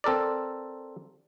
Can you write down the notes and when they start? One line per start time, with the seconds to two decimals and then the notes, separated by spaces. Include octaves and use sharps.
0.04 C4 A4 A#4 D5